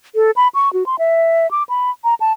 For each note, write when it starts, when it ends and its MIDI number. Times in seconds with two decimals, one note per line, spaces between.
0.15 0.31 69
0.36 0.48 83
0.55 0.72 85
0.73 0.86 66
0.86 0.96 84
0.99 1.50 76
1.51 1.63 86
1.69 1.90 83
2.04 2.14 82
2.20 2.32 81